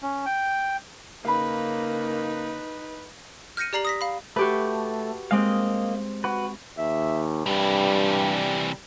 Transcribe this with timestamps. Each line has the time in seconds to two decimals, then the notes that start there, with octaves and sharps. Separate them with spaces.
0.02 C#4
0.26 G5
1.25 C#3 A#3 D#4 B4 F5 B5
3.57 F6 G6 A#6 C#7 D#7
3.73 G4 D5 A#5 C7 F#7
3.85 D#6 A#6 B6
4.01 F5 B5
4.36 A3 F#4 G4 B4
5.31 G#3 A#3 C4 D#5 F5
6.24 F#4 B4
6.78 D#2 E5
7.46 G2 C3 E3 G3